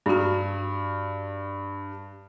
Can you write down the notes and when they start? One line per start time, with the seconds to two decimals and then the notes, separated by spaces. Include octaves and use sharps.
0.06 G2 D4 F#4 F6